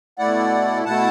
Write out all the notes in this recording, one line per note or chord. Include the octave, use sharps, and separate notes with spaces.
B2 A3 E4 D5 F#5
B2 A3 E4 F#5 A5